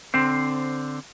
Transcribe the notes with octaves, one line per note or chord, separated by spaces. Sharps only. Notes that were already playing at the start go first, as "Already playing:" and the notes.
D3 C4 C5